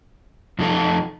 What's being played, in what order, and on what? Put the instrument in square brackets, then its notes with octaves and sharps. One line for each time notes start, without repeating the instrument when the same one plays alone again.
[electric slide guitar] F2 F3 D#4 A4